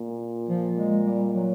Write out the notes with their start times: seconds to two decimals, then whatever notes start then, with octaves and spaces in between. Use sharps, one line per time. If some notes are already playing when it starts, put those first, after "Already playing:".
Already playing: A#2
0.49 F3
0.77 G#3
1.04 G3
1.33 F#3